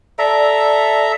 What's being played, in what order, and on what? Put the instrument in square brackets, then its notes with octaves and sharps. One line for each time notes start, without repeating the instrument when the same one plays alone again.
[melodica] A4 E5 A#5 [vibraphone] D5